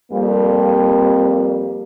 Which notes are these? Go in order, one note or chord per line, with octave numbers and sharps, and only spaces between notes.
F2 G3 A#3